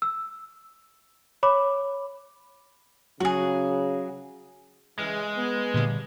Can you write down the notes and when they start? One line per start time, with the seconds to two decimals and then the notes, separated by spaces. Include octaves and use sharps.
0.02 E6
1.43 C#5 B5 D6
3.20 C#3 F#3 F#4 G#4
4.99 C#3 E3 G#3 F6
5.37 B3
5.74 A#2 D3 G3